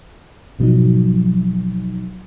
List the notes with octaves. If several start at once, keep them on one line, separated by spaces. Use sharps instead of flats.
G#1 B2 F3 F#3 D#4